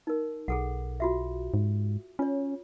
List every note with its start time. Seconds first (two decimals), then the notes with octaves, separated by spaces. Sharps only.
0.07 D#4 A#4
0.48 B1 G#4 A4 F#5
1.00 F4 F#4 E5
1.54 G#2
2.19 C#4 F4 C#5